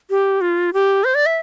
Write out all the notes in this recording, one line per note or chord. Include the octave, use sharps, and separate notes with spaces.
G4
F4
G4
C5
D5
E5